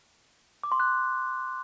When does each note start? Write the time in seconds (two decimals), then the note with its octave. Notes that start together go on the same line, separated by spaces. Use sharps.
0.64 D6
0.72 C6
0.80 F#6